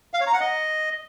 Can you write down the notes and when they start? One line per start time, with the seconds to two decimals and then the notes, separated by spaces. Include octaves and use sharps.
0.14 F5
0.20 C#5
0.27 A#5
0.33 F#5
0.40 D#5